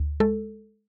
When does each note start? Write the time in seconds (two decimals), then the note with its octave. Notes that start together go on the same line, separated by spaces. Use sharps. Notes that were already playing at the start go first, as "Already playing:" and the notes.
Already playing: D2
0.20 G#3 A4